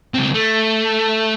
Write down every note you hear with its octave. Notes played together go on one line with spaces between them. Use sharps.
C#2 C4
A3